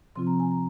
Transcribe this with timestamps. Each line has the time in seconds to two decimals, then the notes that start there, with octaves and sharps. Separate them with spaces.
0.16 C3 F3 C4 F4 C6
0.27 A#5
0.40 G#5
0.51 A#5